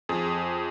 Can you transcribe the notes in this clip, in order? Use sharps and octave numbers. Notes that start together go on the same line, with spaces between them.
F2 G#4